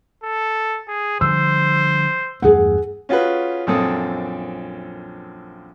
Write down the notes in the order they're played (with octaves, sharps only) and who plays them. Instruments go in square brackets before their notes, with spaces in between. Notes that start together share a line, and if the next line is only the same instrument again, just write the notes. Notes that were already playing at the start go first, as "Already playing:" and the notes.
[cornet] A4
G#4
[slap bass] D3 F3 G3 [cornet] C5 [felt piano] E6
[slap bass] E2 G2 A3 [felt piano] G#4 F#5
[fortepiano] C#4 F4 F#4 G#4 B4
A#1 F#2 C4 A4 D#6